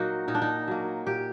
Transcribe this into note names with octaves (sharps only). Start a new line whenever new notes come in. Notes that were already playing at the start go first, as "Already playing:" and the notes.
Already playing: A#2 F#3 A#3 D#4 F#4
A#2 D#4
D4
D#4
F#3 A#3
A#2 G4